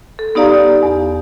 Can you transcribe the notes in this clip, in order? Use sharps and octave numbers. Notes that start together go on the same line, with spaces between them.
A4
B3 D#4 G4 D5 F5 A#5
E2